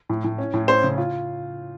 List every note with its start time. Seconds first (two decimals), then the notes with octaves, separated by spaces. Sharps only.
0.09 A2
0.24 A2
0.38 C#4
0.54 A2
0.68 C#4 C5
0.83 C#3
0.98 F4